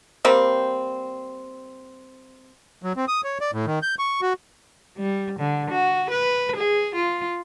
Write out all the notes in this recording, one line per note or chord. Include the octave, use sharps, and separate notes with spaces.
G3 A#3 C4
F#3
C4
D#6
C#5
D5
A2
D#3
G6
C#6
F#4
G3
D3
F#4
B4
G#4
F4